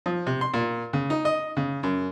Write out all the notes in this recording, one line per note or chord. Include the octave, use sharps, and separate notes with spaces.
F3
C3
C6
A#2
C#3
D#4
D#5
C#3
F#2